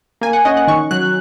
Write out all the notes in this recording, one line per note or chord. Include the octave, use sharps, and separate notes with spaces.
A#3 G#5
F#5
C#4 D#5
F#5
D#3 C#6
F#3 F#6